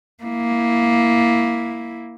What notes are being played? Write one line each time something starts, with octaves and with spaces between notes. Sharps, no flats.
A#3 E4